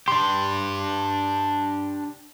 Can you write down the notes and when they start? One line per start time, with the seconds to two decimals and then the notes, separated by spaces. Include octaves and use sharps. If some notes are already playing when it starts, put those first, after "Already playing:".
0.08 D4 G4 C6